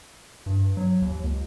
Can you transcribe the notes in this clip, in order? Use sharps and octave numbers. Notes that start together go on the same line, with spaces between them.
G2
F#3
D#2
C#2